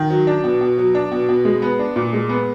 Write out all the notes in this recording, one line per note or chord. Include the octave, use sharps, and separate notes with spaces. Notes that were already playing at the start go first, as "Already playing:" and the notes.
Already playing: D#3
F#3
D4
B2
B2
F#3
D4
B2
B2
G#3
B3
D4
A#2
G#3
B3